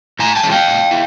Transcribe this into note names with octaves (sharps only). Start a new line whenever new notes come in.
A2 G#5 A#5
G5 A5
E3 G#3 C#4 E4
F5 G5
A2
E4